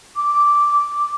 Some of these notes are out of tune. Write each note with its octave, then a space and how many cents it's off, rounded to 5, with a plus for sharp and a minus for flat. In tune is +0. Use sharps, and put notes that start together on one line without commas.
D6 -5